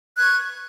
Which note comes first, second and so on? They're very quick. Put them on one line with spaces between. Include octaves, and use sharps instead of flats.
F#6 G#6 C#6